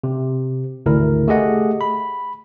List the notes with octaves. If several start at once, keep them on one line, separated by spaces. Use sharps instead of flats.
C3
G#1 D2 C#3 E4 A#4
A3 G4 G#4 D#5 F#5
B5